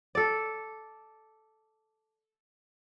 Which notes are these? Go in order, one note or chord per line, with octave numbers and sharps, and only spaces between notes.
A4 D5